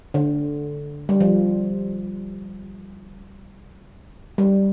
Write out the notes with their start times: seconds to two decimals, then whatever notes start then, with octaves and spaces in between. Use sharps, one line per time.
0.14 D3
1.09 G3
1.20 F3
4.38 G3